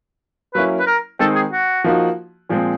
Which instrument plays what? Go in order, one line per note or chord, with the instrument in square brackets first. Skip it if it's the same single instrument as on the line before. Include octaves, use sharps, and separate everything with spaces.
[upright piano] F#3 A#3 C#4 E4 [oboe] B4
[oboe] B4
A#4
[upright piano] D#3 G#3 C4 D#4 [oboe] A4
[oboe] G#4
F#4
[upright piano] F3 A#3 D#4 F#4
A#2 F3 G#3 C4